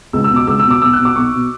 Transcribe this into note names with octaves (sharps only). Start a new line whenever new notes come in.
C#2 E6
E6
B2
D6
C#2 E6
E6
B2
D6
B1 E6
F#6
B2
D6
B1 C#6
B2